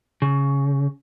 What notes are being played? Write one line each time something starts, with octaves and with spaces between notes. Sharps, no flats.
C#3